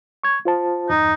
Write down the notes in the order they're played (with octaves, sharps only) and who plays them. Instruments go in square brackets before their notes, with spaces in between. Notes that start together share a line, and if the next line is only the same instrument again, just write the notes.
[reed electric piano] C#6 G#6
F4 C5 A5
[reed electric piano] E2 G2 [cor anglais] D#4